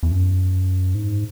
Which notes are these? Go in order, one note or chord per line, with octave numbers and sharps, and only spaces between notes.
E2
F#2
G#2